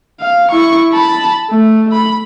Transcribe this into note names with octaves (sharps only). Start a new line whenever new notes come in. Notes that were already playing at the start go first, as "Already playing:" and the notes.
F5
E4 C#6
A5 B5
A3
B5